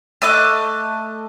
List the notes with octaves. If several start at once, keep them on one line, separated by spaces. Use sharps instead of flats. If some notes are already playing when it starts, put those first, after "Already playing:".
A3 D#5 D6 F#6